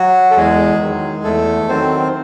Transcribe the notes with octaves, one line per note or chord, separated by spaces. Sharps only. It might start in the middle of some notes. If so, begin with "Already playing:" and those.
Already playing: F#3 F#4
A4
E2 G#3 G#4
D#3 F#3
E2 A3 A4
D#3 F#3 C4 C5